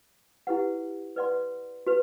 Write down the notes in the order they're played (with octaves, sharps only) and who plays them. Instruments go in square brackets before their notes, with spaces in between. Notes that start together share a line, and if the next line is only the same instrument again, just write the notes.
[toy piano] E4 G4 B4 F#5
B4 D5 F#5 C6
F#4 B4